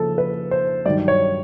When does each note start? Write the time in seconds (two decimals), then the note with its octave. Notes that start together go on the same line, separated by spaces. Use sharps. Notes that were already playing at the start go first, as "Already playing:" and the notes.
Already playing: C#3 F3 A#3 A4
0.18 B4
0.51 C5
0.86 G2 D#3 F#3 D5
1.08 C#5